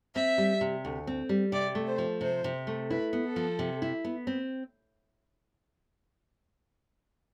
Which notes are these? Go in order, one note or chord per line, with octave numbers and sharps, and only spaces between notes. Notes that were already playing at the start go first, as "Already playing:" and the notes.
C4 E5
G3
C3
D2
C4
G3
C3 D5
A3
C5
F3
C3 C5
C3
A3
E4 B4
B3
A4
F3
C3
E4
B3
C4